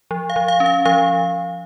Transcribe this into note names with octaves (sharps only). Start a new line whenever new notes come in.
F3
F5
F3
F5
C#4
F5
F3 F5